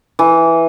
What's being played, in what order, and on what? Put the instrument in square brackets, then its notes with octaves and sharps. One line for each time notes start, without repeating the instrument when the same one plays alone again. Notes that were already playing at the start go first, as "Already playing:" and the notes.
[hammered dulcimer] E3